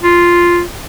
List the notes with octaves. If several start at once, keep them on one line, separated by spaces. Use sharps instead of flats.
F4